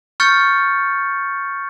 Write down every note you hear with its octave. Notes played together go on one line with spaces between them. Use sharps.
C#6 F6 G6 A6 C#7